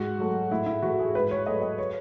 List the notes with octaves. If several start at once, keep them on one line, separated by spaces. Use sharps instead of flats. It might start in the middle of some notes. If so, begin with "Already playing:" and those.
Already playing: G#2 F#4
F#3 A3
A2 E4
E4
E3 A3 F#4
G#4
G#2 B4
C#5
F#3 A3 D#5
D#5
C#5